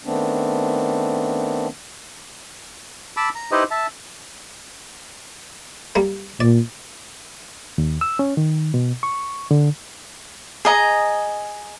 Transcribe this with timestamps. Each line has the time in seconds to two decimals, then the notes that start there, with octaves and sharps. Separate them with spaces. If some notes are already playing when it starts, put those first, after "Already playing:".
0.05 D#3 A3 B3 C4 D4
3.17 A5 B5 D6 E6
3.35 A#5
3.52 D#4 E4 G4 B4 C5 D#5
3.71 E5 A5
5.95 G3 A#3
6.40 A#2 D5
7.78 D#2
8.01 E6
8.19 C#4
8.37 D#3
8.74 B2
9.03 C#6
9.51 D3
10.65 G#4 D#5 A#5